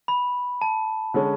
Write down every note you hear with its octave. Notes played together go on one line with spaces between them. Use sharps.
B5
A5
D3 G#3 C#4